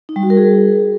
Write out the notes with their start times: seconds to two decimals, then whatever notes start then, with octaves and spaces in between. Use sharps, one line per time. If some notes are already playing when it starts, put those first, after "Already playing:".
0.09 D#4
0.16 G3
0.23 F#4
0.30 A#4
0.37 G#4